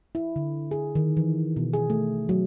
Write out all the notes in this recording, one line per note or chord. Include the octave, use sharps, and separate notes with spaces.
E4
D3
G#4
D#3
E3
B2
G#4
A3
F#3